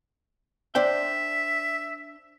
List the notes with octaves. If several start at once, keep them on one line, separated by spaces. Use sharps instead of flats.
D4 C5 E5 G5